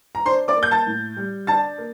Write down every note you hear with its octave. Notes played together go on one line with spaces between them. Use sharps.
A#5
D4 C5 C6
D5 D6
A#3
G6
A5 A6
A2
G3
D4 A5 A6
A#3